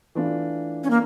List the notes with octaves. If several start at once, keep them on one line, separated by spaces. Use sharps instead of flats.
E3 A3 D4 F4
C#4
A#3